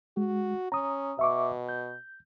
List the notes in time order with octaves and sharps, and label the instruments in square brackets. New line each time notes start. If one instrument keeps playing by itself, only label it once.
[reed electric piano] G#3 [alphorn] F#4
[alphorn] C#4 [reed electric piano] A#5 D#6
[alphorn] B2 [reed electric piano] E5 C#6 D6
[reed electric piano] G6